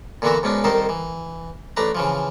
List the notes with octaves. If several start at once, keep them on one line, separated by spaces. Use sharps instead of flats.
A#2 D3 E3 B3 F#4 E5
G#2 B2 B3 C#4 D4
C2 D#3 D#4 A4 C5
E3
A1 A3 D4 B4 A#5
C#3 E3 F3